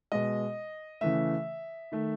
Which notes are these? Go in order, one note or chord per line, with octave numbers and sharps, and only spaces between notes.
B2 G#3 D#5
C#3 E3 A3 E5
D#3 A3